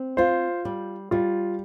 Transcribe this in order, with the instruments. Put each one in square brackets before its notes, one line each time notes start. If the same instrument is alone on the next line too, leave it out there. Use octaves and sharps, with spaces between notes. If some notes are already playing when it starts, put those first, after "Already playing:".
Already playing: [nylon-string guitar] C4
[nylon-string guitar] F4 [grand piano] C5
[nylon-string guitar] G3
[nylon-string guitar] G3 [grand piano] F4